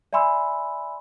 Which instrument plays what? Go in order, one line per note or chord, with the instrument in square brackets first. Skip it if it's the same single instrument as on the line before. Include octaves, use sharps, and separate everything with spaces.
[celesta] D5 E5 G#5 B5 C6 E6